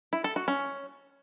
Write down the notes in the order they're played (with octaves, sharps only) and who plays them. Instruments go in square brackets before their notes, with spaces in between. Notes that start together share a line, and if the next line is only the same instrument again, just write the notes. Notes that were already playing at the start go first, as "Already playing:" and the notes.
[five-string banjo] E4
A4
F#4
C#4